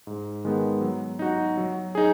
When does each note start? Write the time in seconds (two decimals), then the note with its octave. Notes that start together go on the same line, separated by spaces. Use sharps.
0.07 G#2
0.45 D#3 G#3 B3
0.82 F#3
1.19 D#4 F#4
1.57 F#3
1.95 D#4 G#4